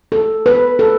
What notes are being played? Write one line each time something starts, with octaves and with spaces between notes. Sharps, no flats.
A4
B4
A4